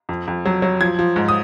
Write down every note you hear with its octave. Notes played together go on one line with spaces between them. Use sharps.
F2
F2
F#3
F#3
F3 G#6
F3
G#2
D#6